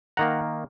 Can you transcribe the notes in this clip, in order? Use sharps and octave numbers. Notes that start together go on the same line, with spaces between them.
D#3 A#3 F#5 A#5